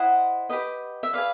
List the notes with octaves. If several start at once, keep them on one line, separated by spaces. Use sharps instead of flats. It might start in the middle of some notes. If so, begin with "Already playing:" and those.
Already playing: E4 C5 D#5 F#5
G4 B4 D#5
E5
G#4 B4 D5 F5